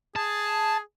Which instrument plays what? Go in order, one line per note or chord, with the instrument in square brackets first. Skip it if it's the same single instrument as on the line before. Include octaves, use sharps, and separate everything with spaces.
[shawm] G#4 [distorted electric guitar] A5